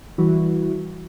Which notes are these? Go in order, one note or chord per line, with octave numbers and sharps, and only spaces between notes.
E3 G3 E4 F#4